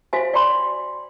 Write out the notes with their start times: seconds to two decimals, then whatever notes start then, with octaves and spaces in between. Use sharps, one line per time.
0.13 F#4 C5 E5 F5 G#5
0.34 D5 G5 G#5 B5 C6